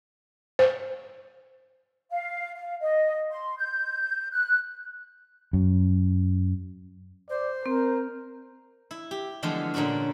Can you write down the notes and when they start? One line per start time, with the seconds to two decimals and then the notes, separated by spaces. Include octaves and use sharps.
0.59 C5
2.10 F5
2.56 F5
2.80 D#5
3.31 C6
3.58 G6
4.32 F#6
5.53 F#2
7.30 C5 D5
7.66 C4 A#4
8.91 E4
9.11 G4
9.43 D3 E3 F3 G#3 A3 B3
9.74 A#2 D3 C#4 D4 F#4